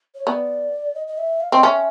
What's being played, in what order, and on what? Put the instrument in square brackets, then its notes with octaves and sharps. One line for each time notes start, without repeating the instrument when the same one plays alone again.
[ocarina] C#5
[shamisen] B3 [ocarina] D5
[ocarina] D#5
D#5
E5
F5
[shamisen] C4 [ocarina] D#5
[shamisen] C#4 [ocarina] E5